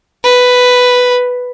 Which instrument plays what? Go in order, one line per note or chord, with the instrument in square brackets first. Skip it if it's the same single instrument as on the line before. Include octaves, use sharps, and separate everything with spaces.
[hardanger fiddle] B4